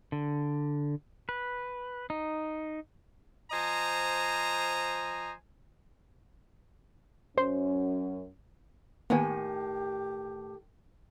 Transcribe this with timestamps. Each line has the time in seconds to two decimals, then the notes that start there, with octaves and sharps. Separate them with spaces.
0.12 D3
1.29 B4
2.10 D#4
3.52 F3 C5 D#5 G#5 A#5
7.38 F#2 C#4 C5
9.10 A2 D#3 A#3 B3 G4 G#5